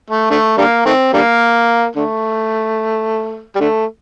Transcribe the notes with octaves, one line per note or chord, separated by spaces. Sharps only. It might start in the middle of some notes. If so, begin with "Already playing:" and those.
A3
D3 A3
D3 G3 A#3
D#3 A3 C4
D3 G3 A#3
D3 A3
G3
D3 A3